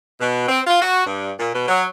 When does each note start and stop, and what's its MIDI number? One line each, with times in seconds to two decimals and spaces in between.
0.20 0.45 47
0.48 0.60 60
0.67 0.79 65
0.82 1.03 66
1.06 1.31 43
1.39 1.50 46
1.54 1.65 47
1.68 1.84 54